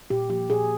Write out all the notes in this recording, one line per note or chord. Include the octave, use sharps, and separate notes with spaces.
A#2 G4
F3 A#3 G4
A#2 G#4